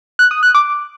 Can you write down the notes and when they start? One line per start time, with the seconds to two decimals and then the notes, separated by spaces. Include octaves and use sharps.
0.19 F#6
0.31 D#6
0.43 F#6
0.55 D6